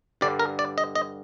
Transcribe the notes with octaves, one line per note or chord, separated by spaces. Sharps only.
G2 D3 G3 D5
A#4
D5
D#5
D#5